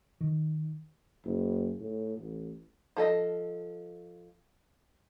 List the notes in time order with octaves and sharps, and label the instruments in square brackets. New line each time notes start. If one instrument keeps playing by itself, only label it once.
[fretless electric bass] D#3
[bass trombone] F#1
A2
A1
[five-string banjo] F3 A4 D#5